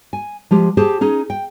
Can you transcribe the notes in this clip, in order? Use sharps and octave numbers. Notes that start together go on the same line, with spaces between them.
G#5
F3 G#3 G4
G4 G#4 C5 A5
C#4 D#4 G#4
G5